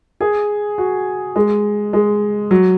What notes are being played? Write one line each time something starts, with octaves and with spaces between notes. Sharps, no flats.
G#4
F#4
G#3
G#3
F#3